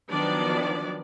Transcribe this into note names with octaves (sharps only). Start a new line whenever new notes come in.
D#3 F3 F#3 B3 D4 D5